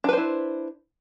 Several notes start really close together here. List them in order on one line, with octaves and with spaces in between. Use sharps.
D4 B4 C5 E4